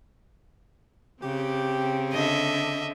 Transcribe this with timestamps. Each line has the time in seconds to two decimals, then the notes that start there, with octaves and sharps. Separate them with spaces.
1.22 C#3 C4 G4
2.12 D3 D#5 E5